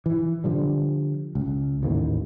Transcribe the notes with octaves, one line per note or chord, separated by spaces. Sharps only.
E3
D3 F3 G3
C#2
A1 D#2 G#2 A#3